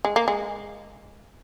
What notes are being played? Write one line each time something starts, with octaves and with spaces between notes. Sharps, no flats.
G#3
A#3
G#3